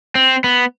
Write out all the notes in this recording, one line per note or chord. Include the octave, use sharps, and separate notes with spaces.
C4
B3